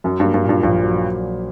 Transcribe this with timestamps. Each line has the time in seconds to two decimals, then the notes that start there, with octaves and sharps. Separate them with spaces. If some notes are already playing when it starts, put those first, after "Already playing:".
0.04 F#2 F#3
0.20 G2 A#3
0.34 G2
0.44 G2 A#2
0.63 A#1 G2
0.83 F#3